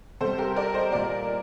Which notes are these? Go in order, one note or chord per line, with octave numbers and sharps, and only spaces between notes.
C3 G3 A4 C5
G4 A#4
A#4 D5
C5 D#5
A#2 G3 A#4 D5